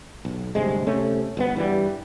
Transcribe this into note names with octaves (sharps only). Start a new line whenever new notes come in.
B1
D2 G2 C3 G#3
C3 A3 C#4
G1 A#2 B3
G2 E3 F#3 G3